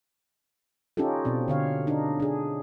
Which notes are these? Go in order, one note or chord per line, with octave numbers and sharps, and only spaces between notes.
C#4 D#4 F4 G4 A4
B2 C4 D5
D3 C#5 F5
D4 D#4
D4 G#4